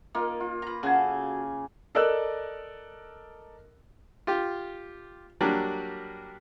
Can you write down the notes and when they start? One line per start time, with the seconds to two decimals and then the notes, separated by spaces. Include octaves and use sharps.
0.15 A#3 D#4 F4
0.40 F4
0.62 B4 A#5
0.83 C#3 F#4 G#4 A4 G#5
1.95 A4 A#4 D5 D#5 E6 F#6
4.27 F4 G4
5.41 F#3 G3 A#3 D4